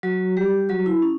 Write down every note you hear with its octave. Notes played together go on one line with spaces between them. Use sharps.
F#3 F#4
G3 G4
F#3 F#4
E4
C#4